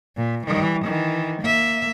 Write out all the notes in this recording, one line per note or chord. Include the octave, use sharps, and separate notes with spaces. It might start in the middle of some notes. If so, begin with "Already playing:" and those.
A#2
E3 G3
D#3 E3
A#3 E5